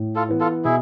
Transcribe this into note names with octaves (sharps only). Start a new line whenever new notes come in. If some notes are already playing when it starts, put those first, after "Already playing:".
Already playing: A2
F4 A4
E3 B3
F4 A4
B2 E4 G#4